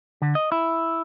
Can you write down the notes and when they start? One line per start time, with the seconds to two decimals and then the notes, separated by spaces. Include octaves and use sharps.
0.22 D3
0.35 D#5
0.52 E4